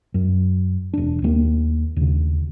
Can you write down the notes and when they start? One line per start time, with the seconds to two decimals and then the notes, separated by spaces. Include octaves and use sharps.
0.14 F#2
0.94 E1 D4
1.22 D#2 G#3 A#3
1.97 D#2 C#3